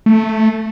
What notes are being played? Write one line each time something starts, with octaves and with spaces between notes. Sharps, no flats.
A3